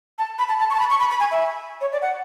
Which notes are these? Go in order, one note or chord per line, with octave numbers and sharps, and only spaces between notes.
A5
B5
A5
A5
C#6
A5
B5
C#6
B5
B5
G#5
E5
C#5
D5
F#5